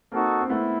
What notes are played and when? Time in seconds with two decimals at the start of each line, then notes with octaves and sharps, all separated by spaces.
0.12 A#3 C4 D#4 F#4 A4
0.40 C4
0.50 A3 B3 E4